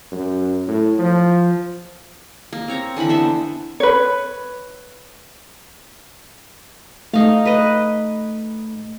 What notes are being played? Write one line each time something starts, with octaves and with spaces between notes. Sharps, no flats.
F#2
A2
F3
A#3
C4 C#5 A#5
D3 E3 F#5 B5
B3 C5 E5
B4 C#5
A3 D#4 F5
B4 D#5